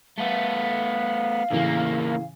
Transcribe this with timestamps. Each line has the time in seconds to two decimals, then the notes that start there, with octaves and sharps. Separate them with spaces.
0.18 A3 B3 F5
1.51 E2 A2 C#3 E3 A#3